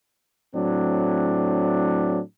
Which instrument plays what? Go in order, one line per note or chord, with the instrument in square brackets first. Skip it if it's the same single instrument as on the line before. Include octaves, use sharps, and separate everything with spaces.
[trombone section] A2 F#3 C4 D4